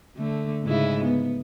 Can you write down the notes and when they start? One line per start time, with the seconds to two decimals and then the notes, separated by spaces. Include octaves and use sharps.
0.17 D3 A3
0.65 G#2 C#3 E4
1.04 B3